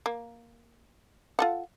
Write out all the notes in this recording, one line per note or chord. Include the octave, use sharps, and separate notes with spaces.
A#3
F4 A4 F#5